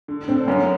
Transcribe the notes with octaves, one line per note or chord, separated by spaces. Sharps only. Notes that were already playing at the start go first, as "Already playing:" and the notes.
D3
D3 C4 D4
F#2 B3 C#4